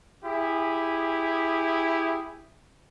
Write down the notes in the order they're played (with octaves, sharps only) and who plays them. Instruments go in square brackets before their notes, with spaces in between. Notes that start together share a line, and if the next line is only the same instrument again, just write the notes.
[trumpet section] E4 G4 G#4